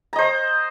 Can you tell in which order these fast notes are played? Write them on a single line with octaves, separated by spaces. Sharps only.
A#5 D#5 C5